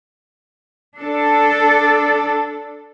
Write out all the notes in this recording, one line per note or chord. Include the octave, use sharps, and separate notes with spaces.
D4 A4